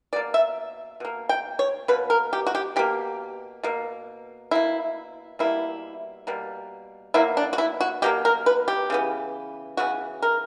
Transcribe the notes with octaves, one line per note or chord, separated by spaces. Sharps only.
B2 A#3 D5
E5
B2 A#3
G5
C#5
B2 A#3 B4
A#4
G4
F#4
G4
B2 A#3 G4
B2 A#3
B2 A#3 E4
B2 G3 A#3 E4
B2 G3 A#3
B2 F#3 A#3 E4
D4
F#4
E4
F#4
B2 F#3 A#3 G4
A#4
B4
G4
C#3 E3 B3
C#3 E3 B3 F#4
A#4